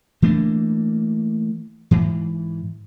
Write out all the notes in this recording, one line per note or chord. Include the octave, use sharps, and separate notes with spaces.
E3 A3 A#3 D4
G#2 E3